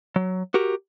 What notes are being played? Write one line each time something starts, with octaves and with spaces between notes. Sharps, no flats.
F#3
F#4 G4 A#4